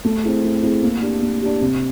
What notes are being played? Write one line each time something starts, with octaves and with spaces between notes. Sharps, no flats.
A3
C4 E4 G#4
A3
C4 E4 G#4
A#3
D4 G4
A#3
D4 G4
C3